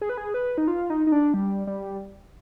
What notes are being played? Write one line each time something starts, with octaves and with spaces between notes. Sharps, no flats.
G#4
B4
G#4
B4
D#4
F4
D#4
D#4
D4
G3
G3